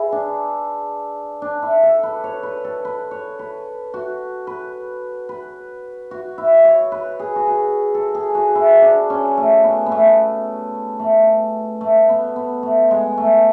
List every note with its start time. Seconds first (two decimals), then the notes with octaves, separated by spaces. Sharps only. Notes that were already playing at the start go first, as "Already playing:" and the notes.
Already playing: E4 G#4 B4
0.12 D4
1.42 D4
1.62 E4
1.83 A4
2.03 B4
2.24 C#5
2.43 B4
2.65 A4
2.85 B4
3.11 C#5
3.39 B4
3.94 F#4
4.47 B4
5.29 B4
6.11 F#4
6.38 E4
6.65 C#5
6.92 B4
7.19 G#4
7.36 F#4
7.47 G#4
7.95 A4
8.15 G#4
8.35 F#4
8.55 E4
8.82 D4
9.10 C#4
9.37 A3
9.64 B3
9.86 B3
9.92 A3
11.00 A3
11.81 A3
12.09 B3
12.36 B3
12.63 A3
12.91 G#3
13.18 A3